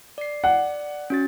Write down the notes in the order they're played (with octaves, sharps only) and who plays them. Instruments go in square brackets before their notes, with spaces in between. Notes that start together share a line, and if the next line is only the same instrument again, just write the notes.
[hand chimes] D5 C7
[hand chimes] D5 [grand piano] F#5
[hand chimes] C#4 F#4 A6